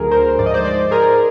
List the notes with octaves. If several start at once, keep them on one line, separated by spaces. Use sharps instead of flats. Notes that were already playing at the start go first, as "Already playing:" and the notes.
Already playing: D2 D3 F#3 G#4 A#4
A#4 C5
G#2 F3 D5
D#5
C5 D5
C5 D5
G#4 A#4